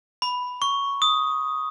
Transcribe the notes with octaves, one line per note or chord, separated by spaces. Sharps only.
B5
C#6
D#6